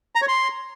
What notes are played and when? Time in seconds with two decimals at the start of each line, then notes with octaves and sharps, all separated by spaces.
0.15 A#5
0.22 C#5
0.28 C6